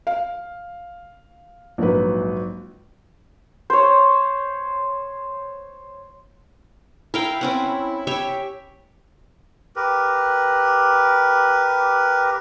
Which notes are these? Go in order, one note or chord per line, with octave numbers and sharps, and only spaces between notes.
F5
A#1 G#2 F#3 B4
C5 C#5
E4 A#4 F5 G5
C4 C#4 F#5
G4 C#5 E5
G4 A#4 B4